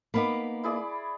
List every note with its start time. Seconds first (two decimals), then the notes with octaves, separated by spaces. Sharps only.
0.14 A#3 B3 D#4 B5 D6
0.63 E4 G#4 D5